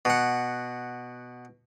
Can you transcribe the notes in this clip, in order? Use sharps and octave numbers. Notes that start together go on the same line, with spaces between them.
B2 F#5